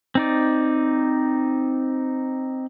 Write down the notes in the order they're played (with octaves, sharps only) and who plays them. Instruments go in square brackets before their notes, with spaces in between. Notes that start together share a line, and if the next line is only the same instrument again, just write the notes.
[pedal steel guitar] C4 D#4 D5